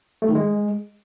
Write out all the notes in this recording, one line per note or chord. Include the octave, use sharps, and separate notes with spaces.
A3
D#3
G#3